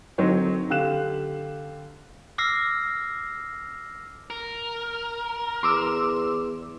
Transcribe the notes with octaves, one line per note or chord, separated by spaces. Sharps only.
D3 F#3 C4 D#4 C#5
D3 G4 F5 F#6 E7
D6 E6 F6 A#6 C7
A#4
E2 C6 D6 E6